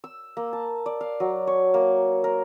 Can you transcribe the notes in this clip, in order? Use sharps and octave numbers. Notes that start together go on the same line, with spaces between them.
E6
A#3
A5
D5
F5
F#3
C#5
A#3
A#4